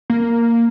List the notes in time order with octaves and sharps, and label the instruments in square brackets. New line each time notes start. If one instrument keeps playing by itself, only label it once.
[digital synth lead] A#3